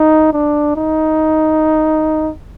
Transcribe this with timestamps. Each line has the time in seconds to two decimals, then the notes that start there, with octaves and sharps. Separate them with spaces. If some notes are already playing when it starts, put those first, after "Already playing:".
Already playing: D#4
0.33 D4
0.76 D#4